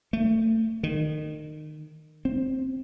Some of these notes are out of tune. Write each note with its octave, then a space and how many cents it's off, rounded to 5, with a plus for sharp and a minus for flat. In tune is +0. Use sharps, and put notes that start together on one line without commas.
A3 +25
D#3 -25
C4 +5